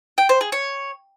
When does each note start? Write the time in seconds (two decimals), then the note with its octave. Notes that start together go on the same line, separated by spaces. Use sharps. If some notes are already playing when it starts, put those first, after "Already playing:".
0.18 G5
0.29 C5
0.41 G#4
0.52 C#5